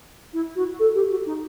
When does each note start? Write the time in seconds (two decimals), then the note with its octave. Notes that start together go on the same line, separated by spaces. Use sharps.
0.33 E4
0.55 F#4
0.79 A4
0.95 G4
1.10 F#4
1.26 D#4